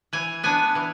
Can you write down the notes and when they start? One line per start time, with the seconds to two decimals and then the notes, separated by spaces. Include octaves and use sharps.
0.13 E3 G#5
0.43 B3 D4 G#5
0.75 E3